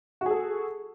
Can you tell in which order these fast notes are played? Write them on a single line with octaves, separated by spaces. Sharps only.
F#4 G#4 A4